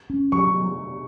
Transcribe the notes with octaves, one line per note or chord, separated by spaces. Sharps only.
C#4
F#3 C#6